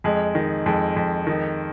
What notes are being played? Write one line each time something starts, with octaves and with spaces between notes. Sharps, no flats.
F2 G#3
D#3
F2 G#3
F2
D#3